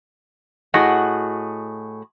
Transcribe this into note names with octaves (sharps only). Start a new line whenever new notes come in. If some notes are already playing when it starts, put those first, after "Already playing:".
A2 F#4 G#4 D#5 F#5